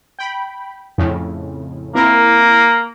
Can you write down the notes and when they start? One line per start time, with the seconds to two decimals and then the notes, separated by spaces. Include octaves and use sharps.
0.19 G5 B5
0.98 F2 A2 C#3
1.95 A#3 C4 E4 A#4